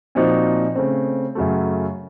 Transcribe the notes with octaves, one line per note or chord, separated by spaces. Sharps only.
A#2 F3 C4 D#4 F#4
C#3 A3 C4
F#2 C#3 F#3 A3